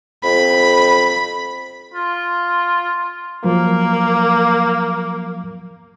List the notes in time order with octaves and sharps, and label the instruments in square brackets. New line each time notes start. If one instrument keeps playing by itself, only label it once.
[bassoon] F2 [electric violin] B5
[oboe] F4
[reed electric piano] F3 F#3 [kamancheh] A#3